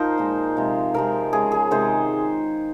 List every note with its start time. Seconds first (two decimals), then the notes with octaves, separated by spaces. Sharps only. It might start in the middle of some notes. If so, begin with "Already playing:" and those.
Already playing: F3 D#4 F4 A#4 C5
0.18 A#2 G#3
0.57 C3 F3 G#3
0.94 C3 F3 G#3 A#4
1.33 C#3 G#3 G#4
1.52 G#4
1.71 C3 D#3 G#3 C5